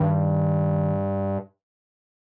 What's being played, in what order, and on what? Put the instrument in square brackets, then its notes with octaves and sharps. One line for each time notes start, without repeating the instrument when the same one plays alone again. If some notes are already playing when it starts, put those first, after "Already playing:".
Already playing: [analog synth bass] G2 [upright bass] D#3